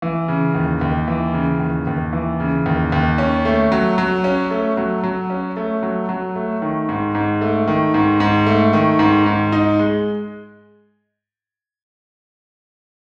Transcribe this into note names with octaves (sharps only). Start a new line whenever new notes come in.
E3
C#3
D#2
D#2
E3
C#3
D#2
D#2
E3
C#3
D#2
D#2
C#4
A3
F#3
F#3
C#4
A3
F#3
F#3
C#4
A3
F#3
F#3
A3
D#3
G#2
G#2
A3
D#3
G#2
G#2
A3
D#3
G#2
G#2
D#4
G#3